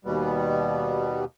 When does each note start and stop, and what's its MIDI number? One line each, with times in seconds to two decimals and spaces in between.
0.05 1.25 39
0.05 1.25 47
0.05 1.25 55
0.05 1.25 59